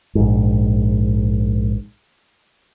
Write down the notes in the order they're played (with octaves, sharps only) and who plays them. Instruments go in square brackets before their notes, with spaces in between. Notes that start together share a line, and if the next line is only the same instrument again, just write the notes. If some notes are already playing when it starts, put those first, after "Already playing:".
[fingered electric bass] A#1 G#2